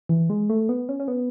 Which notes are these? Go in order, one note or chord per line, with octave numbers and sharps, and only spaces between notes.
E3
G#3
A3
B3
C#4
C#4
B3